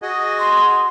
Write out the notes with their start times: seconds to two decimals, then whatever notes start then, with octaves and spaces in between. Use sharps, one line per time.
0.02 F#4 G#4 D#5
0.39 C6